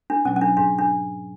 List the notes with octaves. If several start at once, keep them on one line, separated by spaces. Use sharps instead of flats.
D4
B2 F#3 C#4
C#4
D4
G#2 D4
D4